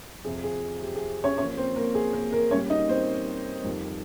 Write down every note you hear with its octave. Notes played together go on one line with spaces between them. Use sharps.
F2 C3 F3 G#4
G#4
G4
G#4
C#4 C#5
A#2 F3 C#4 C#5
C4 C5
A#3 A#4
G#4
A#3 A#4
A#3 A#4
A#2 G3 C#4 C#5
D#4 D#5
C4 C5
F2 D#3 G3